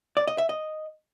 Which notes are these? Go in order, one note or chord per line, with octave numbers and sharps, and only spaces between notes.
D5
D#5
E5
D#5